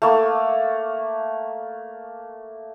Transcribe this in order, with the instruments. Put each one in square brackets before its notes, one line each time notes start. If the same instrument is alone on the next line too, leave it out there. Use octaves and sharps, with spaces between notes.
[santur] A3 A#3